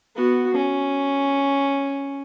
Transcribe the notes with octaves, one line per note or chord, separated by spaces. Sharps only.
B3 F#4
C#4